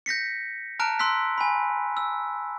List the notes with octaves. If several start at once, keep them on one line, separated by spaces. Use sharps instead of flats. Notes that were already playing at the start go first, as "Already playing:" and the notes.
G6 A#6 B6 C#7
A5 A#5 F6 F#6 D7
C6 E6 F#6 B6
G#5 B5
E6